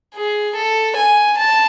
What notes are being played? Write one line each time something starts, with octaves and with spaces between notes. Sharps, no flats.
G#4
A4
G#5
A5